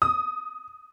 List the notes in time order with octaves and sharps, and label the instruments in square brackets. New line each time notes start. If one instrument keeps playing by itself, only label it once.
[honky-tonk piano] D#6